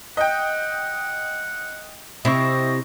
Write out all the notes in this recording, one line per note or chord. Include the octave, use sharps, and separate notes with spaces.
D#5 F#5 G5
C3 C4 E4 D#5 C#6